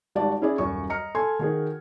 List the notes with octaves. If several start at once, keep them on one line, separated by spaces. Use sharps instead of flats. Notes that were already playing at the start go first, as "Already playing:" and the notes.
G#1 G3 F#4 D5 A5
C#4 E4 G#4 D5
D#1 F#2 C#6
D#5 A#5 F6 C#7
A4 G#5 C6 G#6
D#3 F#4 G#4